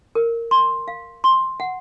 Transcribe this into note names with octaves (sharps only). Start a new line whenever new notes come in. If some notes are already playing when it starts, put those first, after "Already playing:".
A#4
C6
F5
C6
F#5